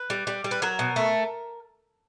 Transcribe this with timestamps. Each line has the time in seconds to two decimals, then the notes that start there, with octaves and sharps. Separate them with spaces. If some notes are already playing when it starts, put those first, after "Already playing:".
Already playing: B4
0.10 G3
0.27 G3
0.44 G3
0.51 B4
0.62 F#3 A#4
0.79 B2
0.96 A3